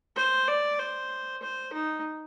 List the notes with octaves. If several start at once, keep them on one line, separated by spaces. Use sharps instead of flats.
C5
D5
C5
C5
D#4